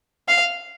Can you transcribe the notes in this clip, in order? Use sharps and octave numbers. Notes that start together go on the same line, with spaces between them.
F5